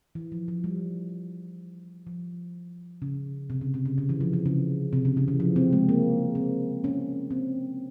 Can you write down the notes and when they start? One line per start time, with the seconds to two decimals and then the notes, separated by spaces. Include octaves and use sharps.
0.15 E3
0.32 F3
0.48 F3
0.64 G3
2.07 F3
3.02 C#3
3.50 C3
3.61 C#3
3.74 C3
3.85 C#3
3.98 C#3
4.09 E3
4.21 F3
4.33 E3
4.46 C#3
4.93 C3
5.05 C#3
5.17 C#3
5.28 E3
5.40 F3
5.56 C4
5.73 G#3
5.89 A#3
6.35 C4
6.84 C#4
7.31 C4